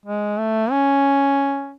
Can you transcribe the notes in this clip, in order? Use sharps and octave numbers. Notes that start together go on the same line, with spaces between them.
G#3
A3
C#4